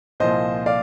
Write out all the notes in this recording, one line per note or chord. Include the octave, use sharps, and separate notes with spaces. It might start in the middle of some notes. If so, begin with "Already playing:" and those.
C2 A#2 F3 C5 D#5
D5 F5